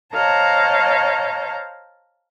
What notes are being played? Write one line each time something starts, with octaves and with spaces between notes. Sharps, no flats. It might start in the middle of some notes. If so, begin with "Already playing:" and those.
C5 C#5 D#5 F5 A5 A#5